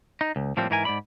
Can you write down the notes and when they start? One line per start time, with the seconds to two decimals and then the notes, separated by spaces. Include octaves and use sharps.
0.21 D#4
0.36 C#2
0.57 A2 F3 G3 A#3 C4
0.70 G#2 E3 E4 A#4 C5 G#5
0.85 G#2 B2 D5 B5